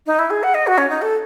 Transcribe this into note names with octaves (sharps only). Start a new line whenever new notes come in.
D#4
E4
G#4
F#5
D#5
F#4
C#4
D#4
A4